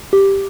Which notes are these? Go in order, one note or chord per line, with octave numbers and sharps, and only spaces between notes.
G4